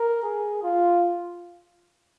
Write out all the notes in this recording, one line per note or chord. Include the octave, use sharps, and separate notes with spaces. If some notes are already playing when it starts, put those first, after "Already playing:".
Already playing: A#4
G#4
F4